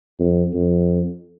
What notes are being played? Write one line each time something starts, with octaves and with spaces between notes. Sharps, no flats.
F2
F2